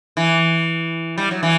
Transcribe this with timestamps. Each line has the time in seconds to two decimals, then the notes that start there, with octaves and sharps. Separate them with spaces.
0.17 E3
1.18 G3
1.31 F#3
1.43 E3